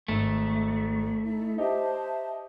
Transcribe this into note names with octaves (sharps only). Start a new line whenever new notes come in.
G#1 A3
D#4 E4
D#4 G4 C5 E5 A5